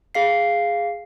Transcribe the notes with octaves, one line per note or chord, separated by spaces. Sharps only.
G#4 F5 C7